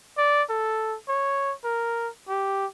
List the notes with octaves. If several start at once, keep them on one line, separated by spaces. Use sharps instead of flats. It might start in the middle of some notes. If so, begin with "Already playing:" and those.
D5
A4
C#5
A#4
G4